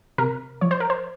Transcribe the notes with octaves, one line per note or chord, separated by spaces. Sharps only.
C3 A#4
F3 C#5
C5
A#4
C5